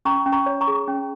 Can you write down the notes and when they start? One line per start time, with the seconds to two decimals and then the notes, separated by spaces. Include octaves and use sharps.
0.05 C#4 A#5 C#6
0.26 C#4
0.32 A#5 C#6
0.46 C#5
0.61 A#5 C#6
0.68 G#4
0.88 C#4